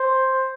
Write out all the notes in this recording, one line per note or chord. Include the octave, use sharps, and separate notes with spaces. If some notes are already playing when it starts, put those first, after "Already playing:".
Already playing: C5